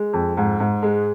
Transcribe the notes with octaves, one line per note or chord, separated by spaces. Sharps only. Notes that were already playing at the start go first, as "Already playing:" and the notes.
Already playing: G#3
F2
G#2
G#2
G#3